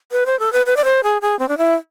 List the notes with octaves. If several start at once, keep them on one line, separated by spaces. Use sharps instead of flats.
B4
C5
A4
B4
B4
D5
C5
G#4
G#4
C4
D4
E4